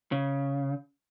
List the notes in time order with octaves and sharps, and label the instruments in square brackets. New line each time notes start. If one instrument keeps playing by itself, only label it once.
[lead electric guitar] C#3